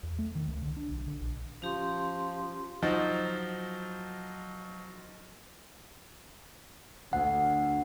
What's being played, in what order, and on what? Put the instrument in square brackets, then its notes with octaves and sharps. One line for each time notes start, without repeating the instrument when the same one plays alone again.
[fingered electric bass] E2
A3
D#3
C#2
D3
D4
B1
D3
A#1
[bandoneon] F3 [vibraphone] C#4 G4 C6
[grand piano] F3 F#3 D#4
[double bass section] D2 [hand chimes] F#5